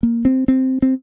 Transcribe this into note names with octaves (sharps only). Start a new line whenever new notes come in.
A#3
C4
C4
C4